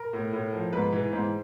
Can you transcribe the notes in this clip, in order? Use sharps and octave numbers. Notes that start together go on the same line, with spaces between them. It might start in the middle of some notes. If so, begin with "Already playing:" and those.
Already playing: A#4
A2
A2
F3
G#2 B4
E3
G#2 C5